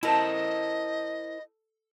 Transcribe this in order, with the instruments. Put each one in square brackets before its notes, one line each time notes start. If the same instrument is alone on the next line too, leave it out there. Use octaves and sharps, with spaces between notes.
[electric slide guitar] E4 A#4 C5 [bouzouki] A4 [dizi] D#5